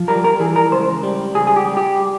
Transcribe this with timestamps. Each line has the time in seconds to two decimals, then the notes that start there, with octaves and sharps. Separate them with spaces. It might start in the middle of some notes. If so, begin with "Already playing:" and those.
Already playing: F3
0.08 G3 A#4
0.24 A#4
0.40 E3 G#4
0.56 A#4
0.71 C#2 C5
1.03 G3
1.35 C#2 G#4
1.47 G#4
1.56 G4
1.66 G3
1.77 G4